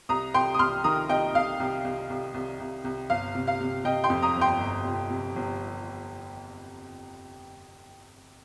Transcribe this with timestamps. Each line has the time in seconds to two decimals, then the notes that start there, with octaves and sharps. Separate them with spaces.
0.09 C2 A#5 D#6
0.34 C2 G5 C6
0.54 D#6
0.59 C2 C6 F6
0.84 D#3 A#5 D#6
1.09 C2 D#5 G5
1.34 C2 F5
1.60 C2
1.85 C2
2.10 C2
2.34 C2
2.60 C2
2.85 C2
3.10 G1 F5
3.35 C3
3.48 F5
3.60 C3
3.85 C3 D#5 G5
4.04 G5 C6
4.10 F2
4.22 A#5 D#6
4.35 G1
4.41 G5 C6
4.60 G1
4.85 C3
5.10 C3
5.36 G1